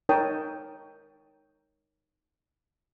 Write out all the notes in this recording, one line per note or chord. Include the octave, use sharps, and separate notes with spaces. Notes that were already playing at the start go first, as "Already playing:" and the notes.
D#4 A#4 C#5 G5 A5 D#6